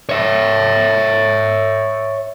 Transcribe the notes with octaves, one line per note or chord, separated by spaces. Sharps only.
C#5 E5